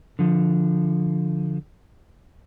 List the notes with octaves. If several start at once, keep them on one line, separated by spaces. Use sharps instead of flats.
D3 F3